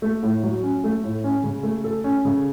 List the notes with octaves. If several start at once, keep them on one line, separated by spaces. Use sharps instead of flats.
A3
A2
F#3
C#4
A3
A2
C#4
C#3
A3
A4
C#4
C#3